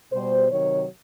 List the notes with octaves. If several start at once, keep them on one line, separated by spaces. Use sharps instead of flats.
B2 G3 C5
C3 D#3 F#3 C#5